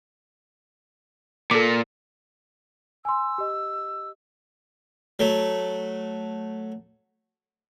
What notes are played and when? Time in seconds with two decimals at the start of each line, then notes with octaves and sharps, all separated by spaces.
1.51 A#2 A4 D6
3.05 G#5 C6 E6
3.38 G4 D#5
5.19 F#3 A3